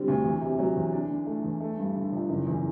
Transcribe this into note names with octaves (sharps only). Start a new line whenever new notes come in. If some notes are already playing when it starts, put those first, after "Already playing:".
Already playing: D3 G3 C4
D2
E2
C3
F#3
E2
D4
D3
A3
E2
A3
G2
D3
G1
F#1
E2